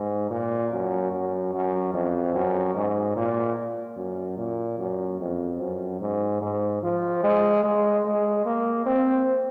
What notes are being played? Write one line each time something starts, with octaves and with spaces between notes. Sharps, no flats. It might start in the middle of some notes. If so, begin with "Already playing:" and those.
Already playing: G#2
A#2
F#2
F#2
F#2
F2
F#2
G#2
A#2
F#2
A#2
F#2
F2
F#2
G#2
G#2
F3
G#3
G#3
G#3
A#3
C4